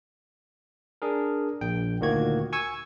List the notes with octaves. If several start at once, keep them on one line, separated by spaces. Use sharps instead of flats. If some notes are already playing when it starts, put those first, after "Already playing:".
D4 G#4 A#4
A#1 G5
D2 A#2 D#3 A#3 F#4 G#6
G#5 C#6 E6 G#6